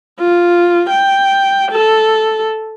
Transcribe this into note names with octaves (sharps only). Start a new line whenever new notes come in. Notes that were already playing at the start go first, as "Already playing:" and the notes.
F4
G5
A4